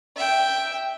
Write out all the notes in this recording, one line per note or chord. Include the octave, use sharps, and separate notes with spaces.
E5 G5